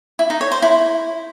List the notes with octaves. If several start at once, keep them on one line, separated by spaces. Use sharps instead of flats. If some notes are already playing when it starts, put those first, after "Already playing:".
E4
D#4
C#5
C5
E4